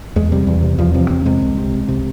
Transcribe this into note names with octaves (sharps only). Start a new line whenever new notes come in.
E2 G#3
C3 G3
E2
C3
E2 F3
C3 F3
E2 C4
C3 G#3
C2
C3
C2
C3